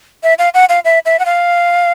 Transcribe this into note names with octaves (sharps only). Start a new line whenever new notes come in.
E5
F5
F#5
F5
E5
E5
F#5
F5